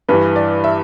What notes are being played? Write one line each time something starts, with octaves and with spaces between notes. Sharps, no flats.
G2 E3 G3 B4
D5
E5